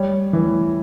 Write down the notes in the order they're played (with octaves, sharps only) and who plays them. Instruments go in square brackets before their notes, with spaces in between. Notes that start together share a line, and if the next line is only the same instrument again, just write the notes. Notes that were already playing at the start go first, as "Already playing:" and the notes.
Already playing: [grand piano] G3 C#5
E3